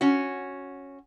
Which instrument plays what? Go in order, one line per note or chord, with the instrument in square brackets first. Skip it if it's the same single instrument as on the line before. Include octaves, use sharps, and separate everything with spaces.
[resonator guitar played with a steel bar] C#4 F#4